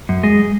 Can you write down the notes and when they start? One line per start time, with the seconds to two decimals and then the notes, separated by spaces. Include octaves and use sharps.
0.09 F#2
0.23 G#3